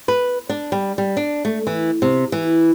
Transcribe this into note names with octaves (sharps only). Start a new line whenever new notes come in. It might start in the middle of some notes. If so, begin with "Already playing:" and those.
B4
D4
G3
G3
D4
A3
E3
C3
E3